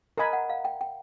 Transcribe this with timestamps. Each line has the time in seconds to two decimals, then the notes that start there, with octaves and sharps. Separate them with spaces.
0.18 A#4 D#5 G#5 A#5 B5
0.33 F#5
0.49 F5
0.65 G5
0.81 G5